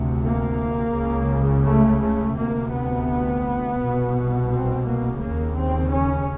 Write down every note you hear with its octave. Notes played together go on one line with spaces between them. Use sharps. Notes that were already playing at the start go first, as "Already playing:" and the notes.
Already playing: D2 C3
A#3
C#2 C#3
A3
A3
D2 C3 A#3
B3
C2 B2
C4
A#3
D#2 C#3 A#3
C4
C#4